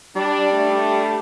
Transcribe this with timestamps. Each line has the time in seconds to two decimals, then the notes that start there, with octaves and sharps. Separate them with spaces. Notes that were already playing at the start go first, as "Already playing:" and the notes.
0.16 G3 D4
0.53 A3 D4